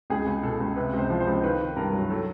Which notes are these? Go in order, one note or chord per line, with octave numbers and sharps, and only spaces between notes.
C#2 G#4
C#2
B2 A4
C#2
C3 B4
C#2
C5
F3
C5
C#2
D#3 B4
D#3
G2 A#4
F#3
F#3 A4